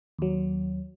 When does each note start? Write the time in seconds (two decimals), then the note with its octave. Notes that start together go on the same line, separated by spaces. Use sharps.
0.19 D#2 F#3